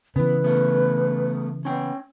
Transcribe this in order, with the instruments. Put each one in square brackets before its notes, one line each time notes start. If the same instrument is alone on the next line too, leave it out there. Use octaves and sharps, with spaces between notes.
[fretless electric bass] C#3 E3 [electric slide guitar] B3 [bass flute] B4
[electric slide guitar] A3 B3
[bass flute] B3 [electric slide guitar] C#4 G5